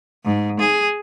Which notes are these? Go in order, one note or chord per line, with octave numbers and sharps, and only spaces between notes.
G#2
G#4